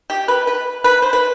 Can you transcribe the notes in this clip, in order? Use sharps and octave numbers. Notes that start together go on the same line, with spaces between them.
G4
B4
B4
B4
C5
B4